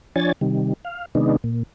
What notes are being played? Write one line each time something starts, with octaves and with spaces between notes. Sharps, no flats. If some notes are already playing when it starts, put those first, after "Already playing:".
F3 D4 C#5 G#5 A6
C3 D#3 G3
F5
C3 D#3 G#3 B3 D4 D#4
A#2